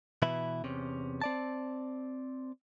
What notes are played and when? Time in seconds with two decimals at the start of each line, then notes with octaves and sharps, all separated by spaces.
0.22 B2 E3 E4 E5 B5
0.64 E2 C3 C#4
1.21 C4 D5 A5